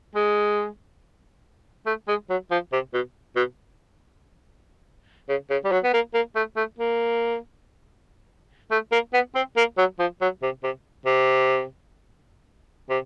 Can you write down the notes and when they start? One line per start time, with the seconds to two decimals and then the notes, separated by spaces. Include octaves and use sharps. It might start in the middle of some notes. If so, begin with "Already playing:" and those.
0.15 G#3
1.86 A3
2.08 G#3
2.30 F#3
2.51 F3
2.72 C3
2.94 B2
3.36 B2
5.29 C#3
5.50 C#3
5.64 G3
5.72 F#3
5.84 B3
5.93 A#3
6.14 A#3
6.36 A3
6.56 A3
6.79 A#3
8.71 A3
8.92 A#3
9.13 B3
9.35 C4
9.57 A#3
9.78 F#3
9.99 F3
10.21 F#3
10.42 C3
10.63 C3
11.06 C3
12.90 C3